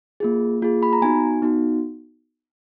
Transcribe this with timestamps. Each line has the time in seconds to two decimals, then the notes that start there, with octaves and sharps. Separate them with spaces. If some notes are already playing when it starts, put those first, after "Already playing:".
0.20 A#3 F4 G#4
0.62 A#3 F4 G#4
0.83 B5
0.93 A#5
1.02 B3 D#4 F#4 G#5
1.42 B3 D#4 F#4